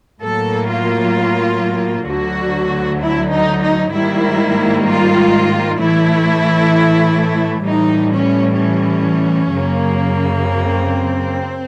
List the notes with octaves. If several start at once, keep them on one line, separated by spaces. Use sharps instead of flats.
A2 F#3 A#3 A4
F4
D2 D3 F#3 F#4
E4
D#4
D#4
G#2 D#3 G3 A#3 E4
F4
A2 E3 A3 E4
A2 E3 G3 D#4
C#4
C#4
F#2 C#3 F#3 A#3
C4